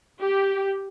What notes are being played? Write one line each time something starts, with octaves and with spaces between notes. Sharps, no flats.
G4